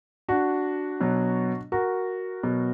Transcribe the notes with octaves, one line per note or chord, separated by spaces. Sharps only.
D4 F#4
B2 F#3
F#4 A#4
B2 F#3